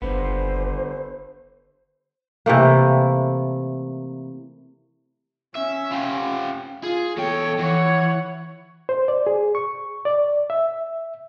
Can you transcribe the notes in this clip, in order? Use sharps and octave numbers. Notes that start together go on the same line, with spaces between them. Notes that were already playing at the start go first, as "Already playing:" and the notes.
F#1 D3 B3 C5
C3 E3 A3 A#3
C#4 E5
F4 G4
F4 G#4
E2 A4 C#5 G5
E3 C#5 F#5
C5
D5
G#4
C#6
D5
E5